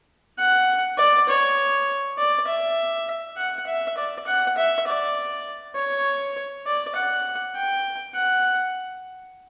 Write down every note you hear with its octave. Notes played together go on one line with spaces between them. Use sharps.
F#5
D5
C#5
D5
E5
F#5
E5
D5
F#5
E5
D5
C#5
D5
F#5
G5
F#5